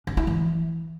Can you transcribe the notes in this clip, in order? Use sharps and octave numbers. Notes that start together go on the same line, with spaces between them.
D4
E4
E3